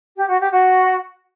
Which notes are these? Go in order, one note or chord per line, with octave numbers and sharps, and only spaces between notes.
G4
F#4
G4
F#4